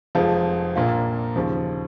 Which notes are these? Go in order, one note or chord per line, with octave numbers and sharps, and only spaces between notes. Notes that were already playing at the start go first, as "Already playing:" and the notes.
F1 F2 F3 G#3 F4
A#1 A#2 A#3 F4
D#2 C#3 F3